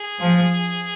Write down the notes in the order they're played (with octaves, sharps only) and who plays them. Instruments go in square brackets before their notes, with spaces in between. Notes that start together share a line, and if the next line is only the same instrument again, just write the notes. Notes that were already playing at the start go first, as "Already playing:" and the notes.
Already playing: [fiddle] G#4
[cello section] F3